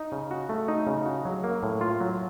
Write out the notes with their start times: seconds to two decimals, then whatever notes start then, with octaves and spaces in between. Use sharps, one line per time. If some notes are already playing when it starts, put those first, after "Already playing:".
Already playing: D#4
0.12 C#3
0.31 F#4
0.49 A3
0.68 D#4
0.87 C#3
1.06 F#4
1.25 F#3
1.44 A#3
1.63 A2
1.81 F4
2.00 F#3